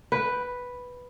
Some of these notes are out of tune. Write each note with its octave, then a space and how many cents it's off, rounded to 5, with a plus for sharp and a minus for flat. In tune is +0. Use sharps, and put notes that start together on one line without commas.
B4 +0 G5 +0